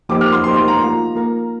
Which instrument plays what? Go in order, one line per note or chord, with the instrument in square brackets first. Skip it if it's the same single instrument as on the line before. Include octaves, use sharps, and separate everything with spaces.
[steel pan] F3 A#3 D#4 G4 C5 [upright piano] D6
[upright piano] F6
C6
[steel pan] F3 A#3 D#4 G4 C5 [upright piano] C6
[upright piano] C6
A#5
[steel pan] A#3 F4 A#4
A#3 F4 A#4